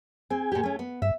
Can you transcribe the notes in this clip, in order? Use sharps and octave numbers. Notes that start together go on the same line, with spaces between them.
C4 G#4 G#5
A#2 G4
A3 C#4
B3
G2 E5